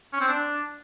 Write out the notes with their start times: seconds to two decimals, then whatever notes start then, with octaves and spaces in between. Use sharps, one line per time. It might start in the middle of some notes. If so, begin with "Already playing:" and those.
0.13 C#4
0.21 C4
0.28 D4